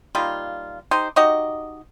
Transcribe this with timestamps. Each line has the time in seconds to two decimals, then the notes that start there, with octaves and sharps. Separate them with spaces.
0.15 G3 A#3 D#4 F4
0.91 D#4 G4 C5
1.16 D#4 F#4 G4 D#5